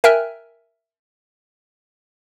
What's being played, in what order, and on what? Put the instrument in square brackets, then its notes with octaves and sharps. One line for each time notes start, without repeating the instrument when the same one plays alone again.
[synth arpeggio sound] A#4 E5 G5 G#5 F6 F#6